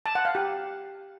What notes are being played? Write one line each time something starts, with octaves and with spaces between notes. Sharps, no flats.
A5
F#5
F5
G4